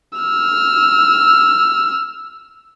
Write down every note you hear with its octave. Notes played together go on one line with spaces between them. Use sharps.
E6 F6